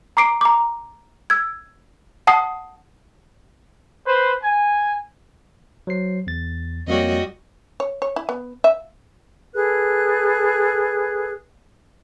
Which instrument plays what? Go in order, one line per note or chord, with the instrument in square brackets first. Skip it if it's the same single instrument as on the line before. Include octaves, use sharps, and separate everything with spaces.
[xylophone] A#5 D6 C7 D7
A#5 D6
E6 G#6
F#5 A5 D#6 C7
[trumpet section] B4 C5
G#5
[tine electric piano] F#3 C5 C7
E2 A6
[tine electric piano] F2 A#3 C#5 [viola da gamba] G3 F#4 D#5
[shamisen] C#5
C#5
E4
B3
E5
[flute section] G#4 A4 B4 F#6